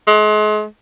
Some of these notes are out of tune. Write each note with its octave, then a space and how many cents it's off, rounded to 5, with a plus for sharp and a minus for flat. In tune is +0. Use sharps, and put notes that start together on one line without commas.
G#3 +40